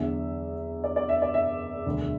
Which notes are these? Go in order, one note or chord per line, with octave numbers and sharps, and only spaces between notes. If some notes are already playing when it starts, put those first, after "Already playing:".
Already playing: E2 D3 F#3 E5
D5
D5
E5
D5
E5
E1 D2 D3 F#3